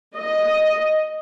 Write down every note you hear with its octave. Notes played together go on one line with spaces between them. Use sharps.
D#5